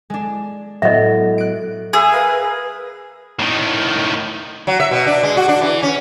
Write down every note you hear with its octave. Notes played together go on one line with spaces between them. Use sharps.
G#3 D4
A2 F#3 B3 D#5 E5
F#6 D7
G#4 B4 E5 G#5
A#4 B4 F5 B5
A2 D#3
F#3
E5
B2
D4
G#3
F#4
D4
E3
C#4